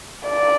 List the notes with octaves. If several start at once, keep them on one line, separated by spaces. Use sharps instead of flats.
D5